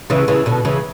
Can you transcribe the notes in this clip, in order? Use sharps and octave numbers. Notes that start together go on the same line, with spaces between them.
C#3 E3
C#3 E3
B2 D3
C#3 E3